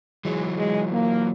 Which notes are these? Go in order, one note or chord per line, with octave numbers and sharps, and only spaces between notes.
E3 F#3 G#3
G#3
A#3